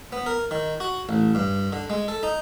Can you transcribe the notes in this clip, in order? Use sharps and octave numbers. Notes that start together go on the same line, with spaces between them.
B3
A#4
D#3
F#4
A1
G2
D3
G#3
A4
D#4